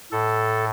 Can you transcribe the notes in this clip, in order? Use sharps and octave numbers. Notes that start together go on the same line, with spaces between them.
A2 A4